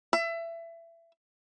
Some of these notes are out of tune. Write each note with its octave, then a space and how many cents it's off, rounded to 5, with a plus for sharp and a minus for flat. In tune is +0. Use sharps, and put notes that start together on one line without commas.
E5 +25